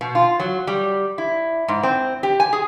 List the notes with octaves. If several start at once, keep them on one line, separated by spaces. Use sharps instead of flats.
B2
F4
F#3
G3
E4
G#2
C4
G4
G#5
G#4